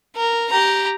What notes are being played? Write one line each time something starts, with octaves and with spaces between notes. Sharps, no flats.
A#4
G4 A#5